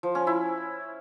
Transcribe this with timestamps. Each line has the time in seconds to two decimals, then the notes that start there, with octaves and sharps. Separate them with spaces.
0.03 F3
0.15 C#4
0.27 E4